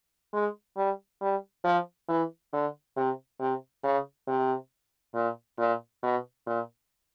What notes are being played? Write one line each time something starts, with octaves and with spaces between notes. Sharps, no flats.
G#3
G3
G3
F3
E3
D3
C3
C3
C#3
C3
A#2
A#2
B2
A#2